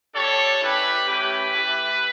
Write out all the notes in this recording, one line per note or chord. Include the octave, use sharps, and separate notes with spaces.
G3 D4 G4 A4 C#5
G3 C#4 E4 G4 B4
A3 C#4 E4 G4 B4
A3 E4 G4